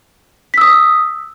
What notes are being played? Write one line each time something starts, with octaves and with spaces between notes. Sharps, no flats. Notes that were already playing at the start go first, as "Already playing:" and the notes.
D#6 E6 B6